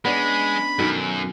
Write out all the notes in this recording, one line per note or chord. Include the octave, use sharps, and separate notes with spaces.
G#3 B3 C#4 D4 B5
F#2 B2 D#3 A4